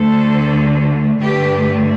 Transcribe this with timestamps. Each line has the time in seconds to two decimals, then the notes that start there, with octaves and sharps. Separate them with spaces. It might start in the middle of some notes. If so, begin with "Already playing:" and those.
Already playing: D2 D3 A3 A4 C5
1.21 G2 D3 A3 G4 B4